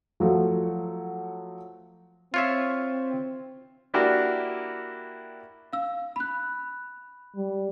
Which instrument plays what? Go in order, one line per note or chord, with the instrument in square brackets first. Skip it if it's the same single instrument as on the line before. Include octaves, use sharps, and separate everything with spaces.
[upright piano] F3 F#3 A3
[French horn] C4 [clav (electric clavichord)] F4 C#5 E5
[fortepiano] A#3 D4 E4 F#4 G4 A#4
[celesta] F5 E6
B5 F#6
[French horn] G3